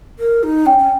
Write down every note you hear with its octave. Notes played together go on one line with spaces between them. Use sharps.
A#4
D#4
C#4 G5
C#4